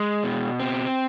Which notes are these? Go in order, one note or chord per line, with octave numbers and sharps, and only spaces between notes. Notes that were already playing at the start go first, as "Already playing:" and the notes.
Already playing: G#3
B2
C4